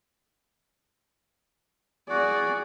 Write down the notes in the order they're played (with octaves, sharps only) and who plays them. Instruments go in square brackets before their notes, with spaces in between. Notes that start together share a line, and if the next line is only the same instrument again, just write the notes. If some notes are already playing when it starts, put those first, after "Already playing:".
[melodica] F#4 F#5 [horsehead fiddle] G#4 D5